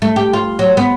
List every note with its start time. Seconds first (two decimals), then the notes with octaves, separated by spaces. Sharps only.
0.02 A3
0.16 G4
0.33 F4
0.59 F#3
0.77 B3